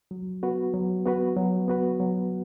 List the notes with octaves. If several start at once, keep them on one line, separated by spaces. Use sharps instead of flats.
F#3
B3 F#4 B4
F#3
B3 F#4 B4
F#3
B3 F#4 B4
F#3